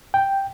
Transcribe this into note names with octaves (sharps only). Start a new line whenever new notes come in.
G5